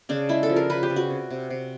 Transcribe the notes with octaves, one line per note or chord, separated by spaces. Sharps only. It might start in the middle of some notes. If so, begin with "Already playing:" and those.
C#3 D4
G#3 E4
A4
F3
A#4
C#3 B4
G4
C#3
F#4
C3
C3
C3